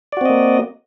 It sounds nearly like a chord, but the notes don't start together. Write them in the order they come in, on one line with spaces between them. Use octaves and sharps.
D5 F#4 C4 D#5 A#3